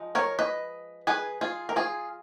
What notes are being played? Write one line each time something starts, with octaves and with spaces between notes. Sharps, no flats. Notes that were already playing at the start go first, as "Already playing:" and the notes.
Already playing: F3 G#3 D#4
A#4 C#5
B4 D#5
G#4 B4
F4 G#4
A#4
F4 G#4